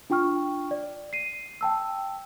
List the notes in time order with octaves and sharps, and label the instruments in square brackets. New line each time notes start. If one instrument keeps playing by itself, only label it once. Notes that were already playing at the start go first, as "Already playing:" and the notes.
[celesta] D4 F4 G5 C#6 F6
D5
C7 D#7
G5 A5 E6